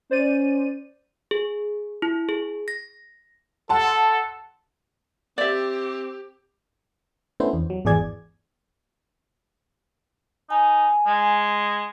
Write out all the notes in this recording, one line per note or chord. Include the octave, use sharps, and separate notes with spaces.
C#4 C5 D5 D#7
G#4
E4
G#4
A#6
A4 F#5 A5 C6
C4 G4 D5 E5
A3 B3 C#4 D4 E4 C5
E2
F#3
G#1 E2 E3 G#4 D5 G#6
D#4 G#5
G#3